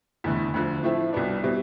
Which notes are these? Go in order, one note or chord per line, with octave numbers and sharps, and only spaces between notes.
F1 E2 D3 A3
D2 D3 F3
A2 F3 A3 C4 E4
C2 B2 B3 D4
B2 G3 C4 E4